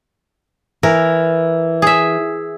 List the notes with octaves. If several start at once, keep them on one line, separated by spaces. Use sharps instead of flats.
E3 A#4
G#4 E5